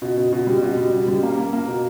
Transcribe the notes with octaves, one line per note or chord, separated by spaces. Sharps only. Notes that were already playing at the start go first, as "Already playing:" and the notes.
B2
B2
B2
G3
B2
G3
B2
G3
A#3
A#3
A#3
B2